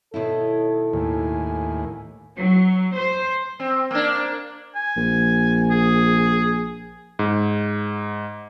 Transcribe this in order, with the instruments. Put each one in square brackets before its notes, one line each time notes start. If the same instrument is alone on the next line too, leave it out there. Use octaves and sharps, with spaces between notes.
[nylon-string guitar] B2 D#3 E4 [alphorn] A4 [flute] C#5
[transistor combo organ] D#2 A2 [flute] G#5
[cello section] F#3
C5
[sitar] C4
A#3 D4
[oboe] G#5
[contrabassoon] A#1
[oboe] G#4
[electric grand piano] G#2